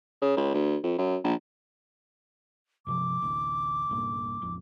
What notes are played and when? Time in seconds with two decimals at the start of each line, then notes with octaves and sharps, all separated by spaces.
0.21 C#3
0.37 C#2
0.54 D2
0.83 F2
0.98 F#2
1.24 A#1
2.87 G2 C3 F3 D6
3.22 A1 D2
3.89 C2 G2 A#2
4.42 A1 F2